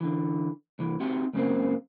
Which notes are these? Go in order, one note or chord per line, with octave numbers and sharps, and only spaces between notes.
D3 E3
C2 E3
C4 D#4 F#4 G4 E5 C6
C#2 F#2 C#3 F#3 A#3 C4